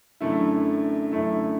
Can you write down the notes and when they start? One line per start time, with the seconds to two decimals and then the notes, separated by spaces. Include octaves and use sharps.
0.21 F#2 D3 A3 E4
1.12 F#2 D3 A3 E4